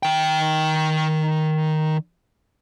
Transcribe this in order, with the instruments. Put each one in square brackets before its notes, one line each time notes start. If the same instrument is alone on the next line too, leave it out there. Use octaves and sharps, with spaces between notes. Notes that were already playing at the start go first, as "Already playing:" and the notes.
[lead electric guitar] D#3 G5